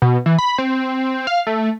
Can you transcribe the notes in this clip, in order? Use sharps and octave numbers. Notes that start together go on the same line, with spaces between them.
B2
E3
B5
C4
F5
A3